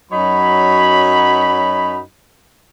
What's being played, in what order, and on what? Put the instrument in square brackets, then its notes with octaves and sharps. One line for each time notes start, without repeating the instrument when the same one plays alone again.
[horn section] F#2 F#3 D#4 C#5 B5